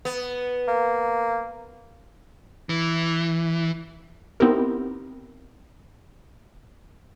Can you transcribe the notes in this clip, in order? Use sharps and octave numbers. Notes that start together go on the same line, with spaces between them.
B3
A#3
E3
B3 C4 D#4 E4 G4 A#4